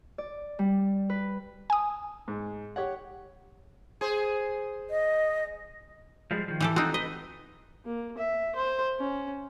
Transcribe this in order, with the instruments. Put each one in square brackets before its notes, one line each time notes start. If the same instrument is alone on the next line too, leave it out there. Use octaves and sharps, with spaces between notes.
[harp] D5
G3
B4
[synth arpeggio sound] G#5 D#6
[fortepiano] G#2
G4 C#5 F#5
[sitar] G#4 C5
[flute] D#5
[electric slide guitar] F3 G3 G#3
D#3 F3
[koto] E3 G4 A4
[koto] C4 D#4 [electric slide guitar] F4 F#4
[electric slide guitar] B4 [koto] D#5
[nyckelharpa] A#3
E5
C5
C#4